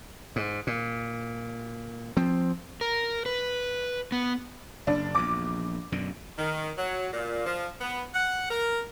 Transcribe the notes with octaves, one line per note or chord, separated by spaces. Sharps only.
G#2
A#2
F3 C4
A#4
B4
B3
F#1 D4
A#1 E2 D6
F#2 B2 D3
D#3
F#3
A#2
F3
B3
F#5
A#4